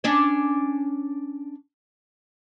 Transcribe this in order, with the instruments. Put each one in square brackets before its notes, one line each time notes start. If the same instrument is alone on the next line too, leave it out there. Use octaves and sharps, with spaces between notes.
[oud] C#4 D4 D5